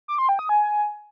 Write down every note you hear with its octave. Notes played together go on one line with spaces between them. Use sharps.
D6
C6
G5
D#6
G#5